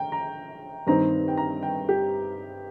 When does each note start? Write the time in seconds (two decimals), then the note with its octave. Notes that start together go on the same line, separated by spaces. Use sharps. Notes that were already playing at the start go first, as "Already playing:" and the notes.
Already playing: G5 A#5
0.12 A#5
0.87 G2 D#3 C4 D#4 A#5
1.28 G5
1.37 A#5
1.63 G5
1.89 G4